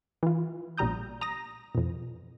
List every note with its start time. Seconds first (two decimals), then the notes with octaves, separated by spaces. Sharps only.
0.23 E3 F4
0.77 A#1 B2 G3 A#5 D#6 G6
1.21 A#5 D#6 A#6
1.75 F2 B2